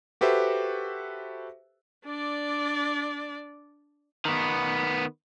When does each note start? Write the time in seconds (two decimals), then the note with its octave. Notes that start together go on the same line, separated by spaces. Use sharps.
0.21 F#4 G4 A4 B4 C5 E5
2.05 D4 D5
4.25 D#3 B3